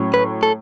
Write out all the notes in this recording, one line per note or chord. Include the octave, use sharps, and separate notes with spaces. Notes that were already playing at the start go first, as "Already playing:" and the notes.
Already playing: A2 F#3 C#4
B4
A4